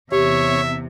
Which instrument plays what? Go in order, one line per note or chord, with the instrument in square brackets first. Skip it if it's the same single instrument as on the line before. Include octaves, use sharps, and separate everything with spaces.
[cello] E2 C3 [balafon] G4 [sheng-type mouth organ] C#5 [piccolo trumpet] E5